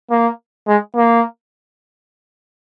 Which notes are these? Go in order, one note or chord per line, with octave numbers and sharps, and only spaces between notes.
A#3
G#3
A#3